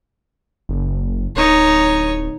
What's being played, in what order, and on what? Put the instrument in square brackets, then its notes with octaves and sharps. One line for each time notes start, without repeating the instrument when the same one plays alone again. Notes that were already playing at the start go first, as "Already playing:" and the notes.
[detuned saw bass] F#1
[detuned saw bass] D1 [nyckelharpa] D#4 C#5